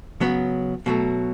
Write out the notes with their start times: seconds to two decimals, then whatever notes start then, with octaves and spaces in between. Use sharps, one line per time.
0.21 C#3 F#3 B3
0.86 B2 F#3 A3